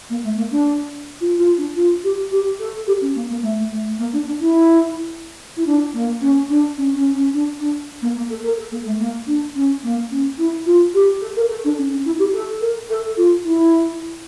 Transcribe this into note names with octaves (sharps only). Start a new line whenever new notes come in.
A#3
A3
A#3
D4
F4
F4
D4
F4
G4
G4
A4
G4
C#4
A#3
A#3
A3
A3
A#3
D4
D4
E4
E4
D4
A#3
C#4
D4
C#4
C#4
C#4
D4
D4
A#3
A#3
A4
A#4
A4
A#3
A3
A#3
D4
C#4
A#3
C#4
E4
F4
G4
A4
A#4
A4
D4
C#4
C#4
E4
G4
A4
A#4
A4
F4
E4